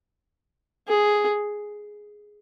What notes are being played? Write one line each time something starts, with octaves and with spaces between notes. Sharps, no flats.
G#4